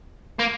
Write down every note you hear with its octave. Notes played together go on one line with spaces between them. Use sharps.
A#3